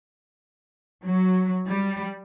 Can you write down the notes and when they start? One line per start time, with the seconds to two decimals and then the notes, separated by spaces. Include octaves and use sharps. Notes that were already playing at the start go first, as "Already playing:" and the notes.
1.04 F#3
1.66 G3